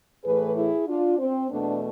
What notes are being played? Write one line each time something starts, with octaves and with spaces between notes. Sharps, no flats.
A2 E3 A3 G#4 B4
E4 G#4
D4 F4
C4
E2 B2 A3 B3 D4